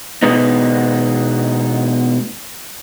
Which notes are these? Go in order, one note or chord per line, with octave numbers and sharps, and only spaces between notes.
B2 G#3 B3 D#4